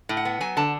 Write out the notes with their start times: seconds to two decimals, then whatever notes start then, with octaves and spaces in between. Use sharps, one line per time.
0.09 A2
0.17 F#5
0.25 B3
0.41 F#3 G#5
0.57 D3 A5